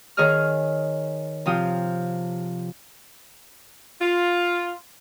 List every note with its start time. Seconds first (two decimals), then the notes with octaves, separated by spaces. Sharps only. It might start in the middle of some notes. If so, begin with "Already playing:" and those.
0.17 D#3 G#4 C#5 D#5 F6
1.46 C3 F3 F4 D#6
4.01 F4